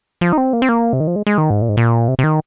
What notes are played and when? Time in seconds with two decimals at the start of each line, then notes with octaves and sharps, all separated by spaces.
0.21 F3
0.33 D#4
0.38 C4
0.53 A#3
0.62 C4
0.69 A#3
0.93 C3
1.00 D#3
1.07 F3
1.16 G#3
1.27 G#3
1.38 D#3
1.50 G#2
1.62 A#2
1.69 G#2
1.77 A#2
2.08 C3
2.19 C3
2.24 D#3